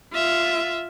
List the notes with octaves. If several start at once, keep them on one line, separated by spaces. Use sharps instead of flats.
F4 E5